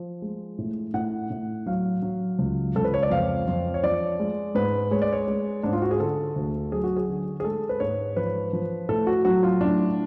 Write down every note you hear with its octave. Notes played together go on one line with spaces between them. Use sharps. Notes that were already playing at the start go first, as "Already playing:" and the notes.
Already playing: F3
G#3
A2
A2 F#5
A2
F#3 F5
F#3
C#2
C#2 A4
B4
C#5
D5
F2 F5
F2
C#5
F3 D5
G#3
G#2 B4
G#3 C#5
D5
C#5
G#3
G#2 D4
F4
F#4
G#4
D3 A4
D2
F#3 G#4
F#4
G#4
D3
G#4
G#3 A4
B4
G#2 C#5
F3 B4
F3
A2 A4
F#4
F#3 F#4
F4
A2 D4